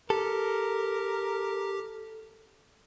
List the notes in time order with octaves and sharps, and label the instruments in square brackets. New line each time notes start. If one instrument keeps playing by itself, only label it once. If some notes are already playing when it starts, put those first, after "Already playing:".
[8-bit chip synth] G4 [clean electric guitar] A4 [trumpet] A#4